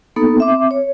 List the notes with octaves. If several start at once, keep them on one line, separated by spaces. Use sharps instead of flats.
A#3 B3 D#4 A4
C4 E5 D6
C#5